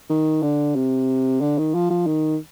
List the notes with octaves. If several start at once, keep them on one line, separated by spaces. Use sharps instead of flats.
D#3
D3
C3
D3
D#3
F3
F3
D#3